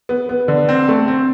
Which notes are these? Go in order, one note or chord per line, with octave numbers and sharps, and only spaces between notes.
B3
B3
D3
C4
A3
C4